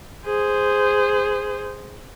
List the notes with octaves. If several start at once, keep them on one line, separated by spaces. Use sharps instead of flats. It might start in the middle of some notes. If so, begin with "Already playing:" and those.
G#4 C5